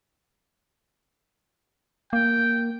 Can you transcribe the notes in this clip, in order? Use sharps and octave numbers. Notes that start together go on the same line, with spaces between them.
A#3 G5